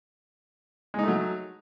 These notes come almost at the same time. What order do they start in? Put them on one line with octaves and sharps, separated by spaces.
G#3 D#4 A3 F#3